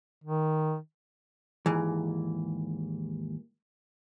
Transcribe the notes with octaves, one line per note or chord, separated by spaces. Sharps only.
D#3
D#2 G#2 E3